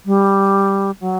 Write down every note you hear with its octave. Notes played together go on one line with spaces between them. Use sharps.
G3
F#3